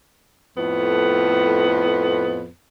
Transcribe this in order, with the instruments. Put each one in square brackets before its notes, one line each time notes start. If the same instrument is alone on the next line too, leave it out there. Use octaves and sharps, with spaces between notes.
[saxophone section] F2 A2 B3